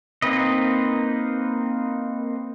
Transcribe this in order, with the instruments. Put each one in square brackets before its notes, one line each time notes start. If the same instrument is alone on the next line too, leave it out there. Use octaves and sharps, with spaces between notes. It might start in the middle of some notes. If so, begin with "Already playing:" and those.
[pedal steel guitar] A#3 C4 D#4 B4 D#5